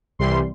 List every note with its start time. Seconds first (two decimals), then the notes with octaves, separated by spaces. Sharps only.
0.19 C2 C3 E3 G3 C6